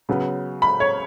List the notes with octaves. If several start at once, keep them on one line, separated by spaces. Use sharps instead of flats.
C#3 F#3 B3
B5
C#5